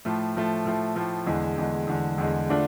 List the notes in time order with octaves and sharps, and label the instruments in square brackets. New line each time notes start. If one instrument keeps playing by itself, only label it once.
[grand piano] A2 F3 A3
A2 F3 A3
A2 F3 A3
A2 F3 A3
E2 D3 G#3
E2 D3 G#3
E2 D3 G#3
E2 D3 G#3
D3 A3 D4 F4